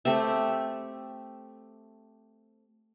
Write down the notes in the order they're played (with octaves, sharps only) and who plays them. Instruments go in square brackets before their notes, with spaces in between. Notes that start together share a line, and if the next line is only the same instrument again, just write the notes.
[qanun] A3 C4 G4 E5